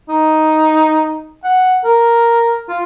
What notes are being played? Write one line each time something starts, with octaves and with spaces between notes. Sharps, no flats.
D#4
F#5
A#4
F4